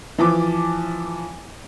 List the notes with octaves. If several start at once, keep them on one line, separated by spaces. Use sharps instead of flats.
E3 F3 D6